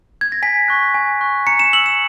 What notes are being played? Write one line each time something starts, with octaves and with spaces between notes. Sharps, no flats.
G#6
A#6
G#5 B6
C#6 F#6
G#5
C#6 F#6
A#5 C#7
E7
E6 F#7
E7